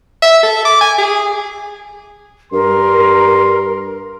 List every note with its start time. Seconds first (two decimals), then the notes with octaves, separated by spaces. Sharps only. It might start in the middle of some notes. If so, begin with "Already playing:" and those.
0.22 E5
0.43 A4
0.65 D6
0.81 G#5
0.98 G#4
2.52 G2 A#4 C6